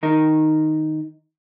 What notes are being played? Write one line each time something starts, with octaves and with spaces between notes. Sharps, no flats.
D#3 D#4 A#4